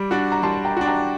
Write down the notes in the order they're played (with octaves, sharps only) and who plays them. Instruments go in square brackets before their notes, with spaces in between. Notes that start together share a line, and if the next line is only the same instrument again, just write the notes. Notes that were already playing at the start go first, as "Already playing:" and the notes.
Already playing: [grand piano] G3 [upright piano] D6
[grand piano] D4 F#4
[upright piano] A#5
[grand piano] G3 [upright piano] A5 C6
[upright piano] G5 A#5
[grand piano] D4 F#4
[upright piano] G5 A#5